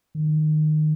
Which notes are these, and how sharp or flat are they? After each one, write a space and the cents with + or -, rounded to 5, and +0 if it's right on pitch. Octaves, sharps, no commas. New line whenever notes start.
D#3 -20